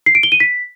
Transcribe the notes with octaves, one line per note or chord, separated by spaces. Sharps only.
C7
D7
G7
D#7
B6